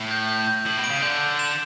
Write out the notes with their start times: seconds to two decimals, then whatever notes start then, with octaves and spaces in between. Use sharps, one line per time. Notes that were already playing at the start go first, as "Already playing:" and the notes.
Already playing: A2
0.11 G6
0.29 G6
0.47 G6
0.66 A2 F#7
0.78 B2
0.84 D7
0.90 C#3
1.02 D3 G6
1.21 G6
1.39 E7